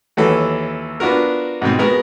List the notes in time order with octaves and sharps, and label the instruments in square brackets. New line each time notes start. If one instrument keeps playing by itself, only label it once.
[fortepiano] D#2 E3 F#3 A4
B3 D4 F4 F#4 A#4
G#2 B2 C4
G#3 B3 F#4 A#4